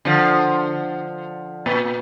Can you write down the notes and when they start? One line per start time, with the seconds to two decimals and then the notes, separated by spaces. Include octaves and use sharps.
0.05 D3 F3
1.66 A#2